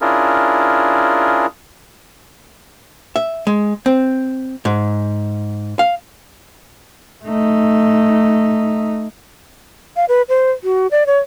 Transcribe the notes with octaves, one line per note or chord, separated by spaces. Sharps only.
C#4 D4 E4 F4 G#4 A#4
E5
G#3
C4
G#2
F5
A3 D#4
F5
B4
C5
F#4
D5
C#5